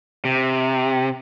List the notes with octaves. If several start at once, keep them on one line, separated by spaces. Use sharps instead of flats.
C3